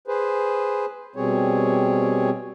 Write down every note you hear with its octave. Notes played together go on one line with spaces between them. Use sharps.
G#4 B4 C5
B2 G3 C4 G#4 C#5